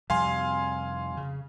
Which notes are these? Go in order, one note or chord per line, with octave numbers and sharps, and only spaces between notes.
F2 C3 G3 F5 G#5 C6
C#3